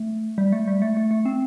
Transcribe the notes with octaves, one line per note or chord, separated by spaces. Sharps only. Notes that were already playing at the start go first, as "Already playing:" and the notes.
Already playing: A3
G3
A3
G3
A3
A3
A3
C4